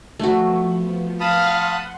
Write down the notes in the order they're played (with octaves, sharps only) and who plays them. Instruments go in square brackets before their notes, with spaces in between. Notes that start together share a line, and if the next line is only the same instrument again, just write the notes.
[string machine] F3 B3 [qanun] A3 F#4
[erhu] F5 [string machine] F#5 C6 [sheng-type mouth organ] A5 B5 D#6